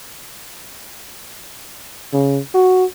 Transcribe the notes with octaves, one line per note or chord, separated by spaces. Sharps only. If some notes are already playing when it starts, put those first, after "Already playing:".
C#3
F#4